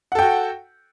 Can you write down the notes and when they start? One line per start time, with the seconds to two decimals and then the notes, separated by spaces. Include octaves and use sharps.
0.12 F#5
0.15 A4
0.19 G5
0.22 F#4